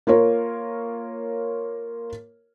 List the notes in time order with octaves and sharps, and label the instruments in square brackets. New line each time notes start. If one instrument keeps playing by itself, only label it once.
[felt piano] A#3 F4 A#4 C#5